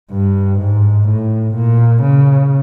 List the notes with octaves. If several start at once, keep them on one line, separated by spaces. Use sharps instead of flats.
G2
G#2
A2
A#2
C#3